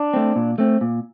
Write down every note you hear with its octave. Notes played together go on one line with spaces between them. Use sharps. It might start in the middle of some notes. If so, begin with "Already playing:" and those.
Already playing: D4
A3 C4
A#2
A3 C4
A#2